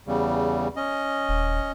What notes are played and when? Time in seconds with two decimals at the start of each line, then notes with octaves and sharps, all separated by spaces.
0.07 E2 C#3 G3
0.76 C#4 D#5
1.29 D#1